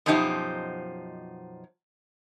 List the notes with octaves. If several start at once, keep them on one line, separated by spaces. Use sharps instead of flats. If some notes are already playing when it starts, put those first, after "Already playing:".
F#2 B2 F3 D#4 G4 C5